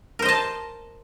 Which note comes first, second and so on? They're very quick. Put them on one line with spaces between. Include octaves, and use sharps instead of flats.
A#4 C5 D#5 A5